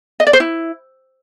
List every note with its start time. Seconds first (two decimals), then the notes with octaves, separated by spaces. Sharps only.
0.20 D#5
0.27 D5
0.33 C5
0.40 E4